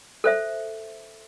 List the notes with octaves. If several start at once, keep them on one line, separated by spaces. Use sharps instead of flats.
A4 C5 E5